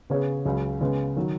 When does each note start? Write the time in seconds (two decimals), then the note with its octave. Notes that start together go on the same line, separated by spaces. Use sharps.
0.10 C#3 B3 G#4 C#5
0.45 C#2 C#3 F#3
0.81 C#3 G#3 B3
1.16 D#3 F#3